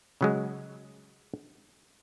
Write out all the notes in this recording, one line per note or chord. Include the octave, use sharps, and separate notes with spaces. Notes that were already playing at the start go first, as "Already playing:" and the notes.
C#3 F#3 G#3